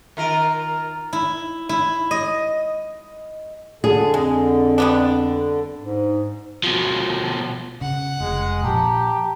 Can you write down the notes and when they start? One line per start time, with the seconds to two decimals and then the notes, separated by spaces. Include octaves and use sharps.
0.17 D#3 F4 A#4
1.13 E4
1.69 E4
2.11 D#5
3.84 D3 G#4 A4
4.14 F2 G#3
4.78 G3 B3 D4
5.80 G#2
6.64 B2 F3
7.81 C#3 F#5
8.20 F1 G#3
8.63 A#2 F3 G4 A5 A#5